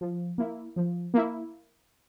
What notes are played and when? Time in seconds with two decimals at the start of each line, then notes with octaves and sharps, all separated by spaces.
0.01 F3
0.38 A#3 E4
0.76 F3
1.14 A#3 E4